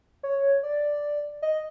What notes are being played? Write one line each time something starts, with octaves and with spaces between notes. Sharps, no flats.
C#5
D5
D#5